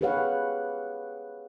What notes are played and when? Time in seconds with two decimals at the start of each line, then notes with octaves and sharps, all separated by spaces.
0.01 G4 G#4 B4 C#5 F5 F#5